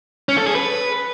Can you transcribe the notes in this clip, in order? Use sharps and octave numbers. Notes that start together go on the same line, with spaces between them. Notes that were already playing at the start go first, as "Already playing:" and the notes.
C#4
A4
G#4
B4